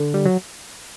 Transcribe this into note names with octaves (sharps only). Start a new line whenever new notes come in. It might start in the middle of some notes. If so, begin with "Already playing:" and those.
Already playing: D3
G3
F#3